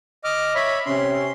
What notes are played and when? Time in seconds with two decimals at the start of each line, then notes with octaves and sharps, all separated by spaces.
0.24 D#5 D6 F6
0.55 C#5 E5 B5
0.86 C3 C#4 C6